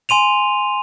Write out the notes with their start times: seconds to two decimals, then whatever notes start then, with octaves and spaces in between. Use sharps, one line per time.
0.09 G#5 C6 D#7 F7